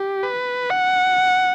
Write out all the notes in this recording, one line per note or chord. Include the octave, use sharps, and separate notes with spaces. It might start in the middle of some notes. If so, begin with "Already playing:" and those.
Already playing: G4
B4
F#5